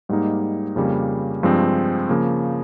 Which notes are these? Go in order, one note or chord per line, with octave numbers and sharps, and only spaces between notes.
G#2 G3 A#3 D#4
F2 C#3 G3 A#3
G2 F3 G#3 C4
C#3 F3 A#3